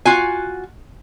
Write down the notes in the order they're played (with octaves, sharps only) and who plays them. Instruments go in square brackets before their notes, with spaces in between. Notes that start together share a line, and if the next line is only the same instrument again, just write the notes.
[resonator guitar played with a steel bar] F4 F#4 G#5